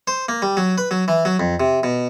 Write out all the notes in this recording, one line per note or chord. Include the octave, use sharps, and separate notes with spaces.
C5
A#3
G3
F#3
B4
F#3
E3
F#3
F2
C3
B2